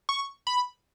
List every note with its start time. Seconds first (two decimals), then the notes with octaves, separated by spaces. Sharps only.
0.09 C#6
0.47 B5